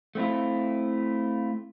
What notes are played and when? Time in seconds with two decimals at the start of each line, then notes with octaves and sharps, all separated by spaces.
0.15 A3 C4 E4 F4